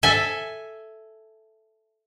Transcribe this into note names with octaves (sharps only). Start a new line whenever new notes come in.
A4 E5 G#5